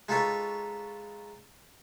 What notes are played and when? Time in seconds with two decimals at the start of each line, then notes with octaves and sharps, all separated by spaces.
0.08 G#3 D#4 F4 A4 B4 C#5